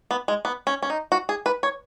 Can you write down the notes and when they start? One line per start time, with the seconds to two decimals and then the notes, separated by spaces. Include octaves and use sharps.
0.11 B3
0.28 G#3
0.45 B3
0.67 C#4
0.83 C#4
0.90 D#4
1.12 F#4
1.29 G#4
1.46 B4
1.63 C#5